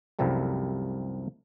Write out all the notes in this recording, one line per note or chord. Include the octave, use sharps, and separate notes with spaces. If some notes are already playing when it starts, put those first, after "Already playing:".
C2 F#2 C3 F3 G3 A3